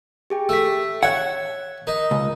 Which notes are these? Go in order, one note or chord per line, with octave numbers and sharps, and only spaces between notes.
G4 G#4 G5
A3 E6 B6
C#5 E5 F#5 F#6 G#6
D#4 A#4
C#2